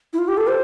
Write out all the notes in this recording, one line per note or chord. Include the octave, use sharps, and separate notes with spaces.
E4
F4
G4
A4
C5